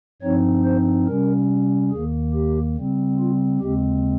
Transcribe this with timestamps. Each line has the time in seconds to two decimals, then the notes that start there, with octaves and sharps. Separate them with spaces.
0.22 G2 F3 C4 D#4 C#5
0.64 C5
1.07 C3 G3 C#4 A#4
1.91 D#2 D#3 A#3 G#4
2.34 G4
2.76 C#3 G3 C4
3.19 F4
3.61 D#2 C#3 G#3 C4 G4